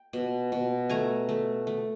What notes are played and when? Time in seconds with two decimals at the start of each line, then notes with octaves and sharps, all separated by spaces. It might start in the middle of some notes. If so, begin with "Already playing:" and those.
Already playing: G5
0.13 B2
0.52 B2
0.89 A3 G#5 A#5
1.29 A3
1.67 A3